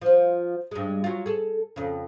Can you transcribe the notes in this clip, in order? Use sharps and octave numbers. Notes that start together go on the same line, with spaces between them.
F3 F4
G2 G#3
F#3 F4
G#4 A4
F2 C#3